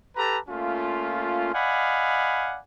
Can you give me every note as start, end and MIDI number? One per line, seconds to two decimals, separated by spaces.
0.16 0.37 67
0.16 0.37 69
0.16 0.37 71
0.16 0.37 81
0.16 0.37 82
0.48 1.53 57
0.48 1.53 58
0.48 1.53 61
0.48 1.53 65
1.54 2.58 74
1.54 2.58 75
1.54 2.58 77
1.54 2.58 78
1.54 2.58 80
1.54 2.58 83